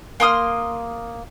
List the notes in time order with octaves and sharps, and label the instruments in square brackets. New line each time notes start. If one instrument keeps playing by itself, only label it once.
[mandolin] A#3 C6 D#6 F6